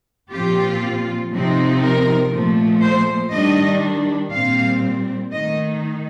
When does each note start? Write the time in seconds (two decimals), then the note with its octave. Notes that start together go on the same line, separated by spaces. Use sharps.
0.32 A#2 F3 C4 F4 G4
1.32 C3 F3 C4 D#4
1.82 A#4
2.32 A#2 F3 A3
2.82 C5
3.32 D#3 G3 D4 D#5
4.31 A#2 G3 C4 F5
5.32 D#3 A3 D#4 D#5